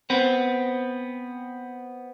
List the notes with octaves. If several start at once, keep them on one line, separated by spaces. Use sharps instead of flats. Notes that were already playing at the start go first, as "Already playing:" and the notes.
B3 C4